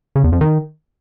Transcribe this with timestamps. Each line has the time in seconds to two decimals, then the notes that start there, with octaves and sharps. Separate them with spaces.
0.16 C#3
0.24 E2
0.32 F2
0.41 D#3